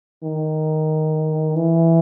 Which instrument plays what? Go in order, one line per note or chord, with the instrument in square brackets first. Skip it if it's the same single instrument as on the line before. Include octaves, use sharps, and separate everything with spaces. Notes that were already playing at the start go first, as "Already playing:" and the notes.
[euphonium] D#3
E3